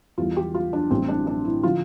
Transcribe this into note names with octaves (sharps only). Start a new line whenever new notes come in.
E2 E3 G3 F4
G4
F4
D4
A1 A2 E3 G3 C4
D4
D4
E4
D3 F3 F4